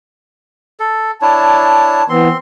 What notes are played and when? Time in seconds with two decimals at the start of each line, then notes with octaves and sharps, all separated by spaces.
0.80 A4
1.22 D4 E4 C#5 A5
2.09 E3 B3 C4 C6